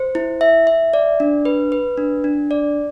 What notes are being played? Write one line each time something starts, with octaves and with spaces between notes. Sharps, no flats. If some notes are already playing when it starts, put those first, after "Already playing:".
Already playing: C5
E4
E5
E5
D5
D4
B4
B4
D4
D4
D5